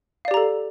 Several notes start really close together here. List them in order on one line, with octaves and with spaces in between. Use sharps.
F5 D5 G4 A#5 A4